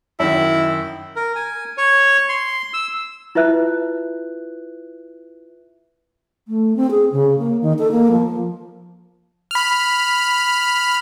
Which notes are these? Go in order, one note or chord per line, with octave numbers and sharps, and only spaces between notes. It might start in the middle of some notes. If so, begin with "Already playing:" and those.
F#2 D#3 E4
A#4
G#5
C#5
C6
E6
E4 F4 B4 E5 F#6
A3
C4
G#4
C#3
A#3
D#3
A4
A#3
F3
B5 F6